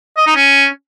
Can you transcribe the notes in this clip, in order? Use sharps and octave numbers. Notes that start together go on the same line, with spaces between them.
D#5
D#4
C#4